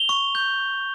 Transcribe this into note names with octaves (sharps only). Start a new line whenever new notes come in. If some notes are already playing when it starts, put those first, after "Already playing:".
Already playing: F7 G7
C#6
G6